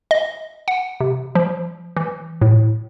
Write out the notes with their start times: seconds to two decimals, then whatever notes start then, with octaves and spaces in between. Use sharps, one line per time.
0.11 D#5
0.68 F#5
1.00 C3
1.35 F3
1.97 E3
2.42 A2